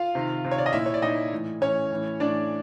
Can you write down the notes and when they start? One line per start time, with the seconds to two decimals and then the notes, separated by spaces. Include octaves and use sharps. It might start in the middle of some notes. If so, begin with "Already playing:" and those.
Already playing: F4 F5
0.15 C3 D#3
0.44 C3 D#3
0.51 C#5
0.58 D5
0.66 D#5
0.73 A#2 E4 E5
0.86 C#5
0.94 D5
1.02 A#2 D#4 D#5
1.32 A2 E3
1.61 A2 E3 C#4 C#5
1.91 A2 E3
2.20 A2 E3 D4 D5